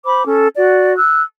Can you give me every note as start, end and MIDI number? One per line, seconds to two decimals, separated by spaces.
0.05 0.24 72
0.05 0.24 83
0.05 0.24 86
0.26 0.47 61
0.26 0.47 69
0.55 0.93 66
0.55 0.93 74
0.96 1.22 88
0.96 1.22 90